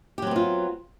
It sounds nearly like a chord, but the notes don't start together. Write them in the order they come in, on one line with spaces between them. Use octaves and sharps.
G4 F#3 C4 B3 F4